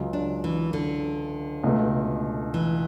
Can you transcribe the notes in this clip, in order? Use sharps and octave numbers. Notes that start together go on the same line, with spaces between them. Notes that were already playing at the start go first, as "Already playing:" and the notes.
Already playing: C#2 C#3 F#3
D4
E3
D3
C#2 B2 A3
E3